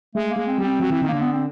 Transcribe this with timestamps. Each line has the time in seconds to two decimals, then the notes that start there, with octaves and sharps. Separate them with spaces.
0.15 G#3 A3
0.31 A#3
0.36 G#3
0.47 C4
0.58 G3
0.64 C4
0.80 F#3
0.90 E3
1.02 D#3
1.08 D3 A#3
1.21 B3
1.33 C4